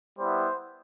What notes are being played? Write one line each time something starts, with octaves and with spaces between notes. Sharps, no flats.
G3 B3 E4 C5